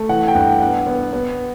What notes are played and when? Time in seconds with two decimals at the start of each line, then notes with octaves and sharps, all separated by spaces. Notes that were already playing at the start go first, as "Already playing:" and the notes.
Already playing: A3
0.09 E3 F#5
0.28 G5
0.34 G2 F#5
0.61 B3 F#5
0.87 B3
1.13 B3